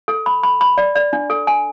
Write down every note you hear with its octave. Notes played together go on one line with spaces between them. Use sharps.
A4
B5
B5
B5
D5
D5
D4
A4
G#5